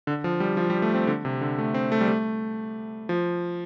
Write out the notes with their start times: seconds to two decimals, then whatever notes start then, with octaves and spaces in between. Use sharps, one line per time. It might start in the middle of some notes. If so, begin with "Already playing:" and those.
0.07 D3
0.24 F3
0.40 G3
0.57 F3
0.70 G3
0.82 A3
0.95 C4
1.07 D3
1.25 C3
1.41 D3
1.59 A3
1.74 C4
1.92 A3
2.01 G3
2.08 A3
3.09 F3